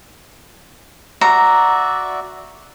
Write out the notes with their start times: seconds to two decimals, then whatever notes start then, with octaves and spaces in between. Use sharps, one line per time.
1.21 F#4 D5 E5 A#5